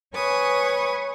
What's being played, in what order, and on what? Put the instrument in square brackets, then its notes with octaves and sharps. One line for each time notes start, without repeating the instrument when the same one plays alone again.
[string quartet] B4 C#5 G#5 C#6 D#6